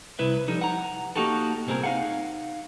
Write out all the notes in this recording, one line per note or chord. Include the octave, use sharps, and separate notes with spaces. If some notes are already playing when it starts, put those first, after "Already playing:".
C2 E4 B4 E5
F3 G3 D#4 A4
F#5 A#5
A#3 B3 D#4 F#4 G4 A4
C2 A#2 C4 C#4 G#4 A#4
D#4 F5 F#5